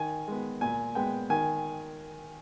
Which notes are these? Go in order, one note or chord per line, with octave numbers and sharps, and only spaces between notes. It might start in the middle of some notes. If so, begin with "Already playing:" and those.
Already playing: D#3 G#5
G#3 B3
A#2 G#5
G#3 B3 G5
D#3 G#5